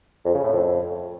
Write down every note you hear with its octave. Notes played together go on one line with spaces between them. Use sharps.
F2
C#3
A2
F2